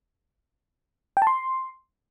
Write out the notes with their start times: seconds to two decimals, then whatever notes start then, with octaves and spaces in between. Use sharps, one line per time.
1.17 G5
1.22 A5
1.27 C6